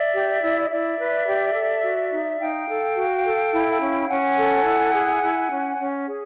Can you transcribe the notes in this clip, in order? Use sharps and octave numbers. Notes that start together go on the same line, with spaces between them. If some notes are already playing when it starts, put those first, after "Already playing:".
Already playing: D5 E5
G4
E4
D#5
E4 D5 E5
B4
G4
A4
F#4
D#4
D#4 F5 G5
A4
F#4
A4
E4
C#4
C#4 F#5 G#5
A4
E4
G#4
E4
C#4
C#4
G#4